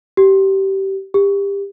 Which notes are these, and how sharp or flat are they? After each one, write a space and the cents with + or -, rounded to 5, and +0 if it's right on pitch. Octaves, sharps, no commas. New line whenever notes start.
G4 -20
G4 +25